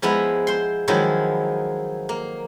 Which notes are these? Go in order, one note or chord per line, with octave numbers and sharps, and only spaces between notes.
F3 G#3 B3 E4 A#5
C5 C6
D#3 F3 F#3 G#3 D#4 E4
A#3